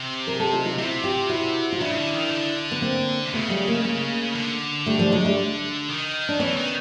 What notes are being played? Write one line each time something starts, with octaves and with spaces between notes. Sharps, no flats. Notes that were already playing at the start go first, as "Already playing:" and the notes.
Already playing: C3
G#4 A#4
G4 A4
D#4 F4
D#4 F4
C3 E4 F#4
F4 G4
E4 F#4
F4
C#3 D4 E4
D3
D#3
D3
B3
A#3 C4
C3
C#3 A3 B3
G3 A3
G#3 A#3
G#3 A#3
D3
G3 A3
F3 G3
F#3 G#3
G3 A3
D#3
D4
E3 B3 C#4
D#3